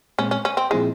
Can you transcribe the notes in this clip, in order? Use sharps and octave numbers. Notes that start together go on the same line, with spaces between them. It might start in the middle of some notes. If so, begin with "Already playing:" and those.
A#2 G#3 C4 C#4
C#4
C#4
C4
A#2 F3 G#3 C4 E4 G#4